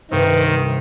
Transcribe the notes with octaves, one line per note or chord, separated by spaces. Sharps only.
C2 G2 D#3 C4